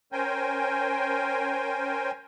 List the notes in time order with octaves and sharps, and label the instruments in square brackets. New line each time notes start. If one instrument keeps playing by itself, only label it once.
[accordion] C#4 A#4 C5 G5 G#5